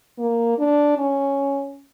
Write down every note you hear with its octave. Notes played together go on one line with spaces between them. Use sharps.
A#3
D4
C#4